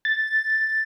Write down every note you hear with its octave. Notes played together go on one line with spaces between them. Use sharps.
A6